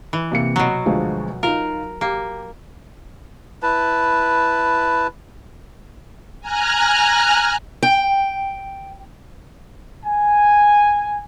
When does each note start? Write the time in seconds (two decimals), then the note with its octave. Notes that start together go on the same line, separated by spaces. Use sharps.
0.13 E3
0.32 C3 A#3 C#7
0.56 B2 F#3
0.86 D2 F3 G#3
1.43 D#4 F4 A#4
2.01 A#3 G4
3.63 E4 B4 A5
6.41 G#5 A#5 F6 F#6
7.83 G5
10.05 G#5